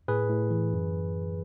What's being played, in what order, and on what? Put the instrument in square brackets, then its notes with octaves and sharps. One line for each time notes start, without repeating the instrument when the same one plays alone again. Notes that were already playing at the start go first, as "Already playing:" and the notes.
[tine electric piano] A2 G#4 B4
A2
E3
F#2